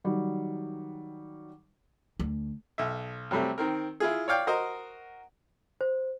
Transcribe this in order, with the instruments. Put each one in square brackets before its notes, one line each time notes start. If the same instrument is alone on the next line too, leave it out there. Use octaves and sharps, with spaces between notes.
[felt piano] D#3 F#3 G3
[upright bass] D2
[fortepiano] B1 E5
C3 F#3 G3 A3 C4
D#3 C4 A#4
E4 F4 G#4
C#5 D5 F5 G5
F#4 A#4 C5 D#5
[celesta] C5